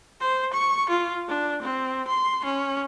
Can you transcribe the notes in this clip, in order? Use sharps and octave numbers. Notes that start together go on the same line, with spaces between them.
C5
C#6
F4
D4
C4
C6
C#4